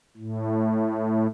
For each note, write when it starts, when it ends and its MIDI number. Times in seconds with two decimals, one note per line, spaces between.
0.17 1.27 45